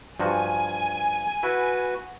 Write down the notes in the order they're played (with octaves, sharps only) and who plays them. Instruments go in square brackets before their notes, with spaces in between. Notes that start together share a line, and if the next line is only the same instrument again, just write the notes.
[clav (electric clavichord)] G2 F3 F#4 [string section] G#5
[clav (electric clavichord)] E4 [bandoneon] F#4 B4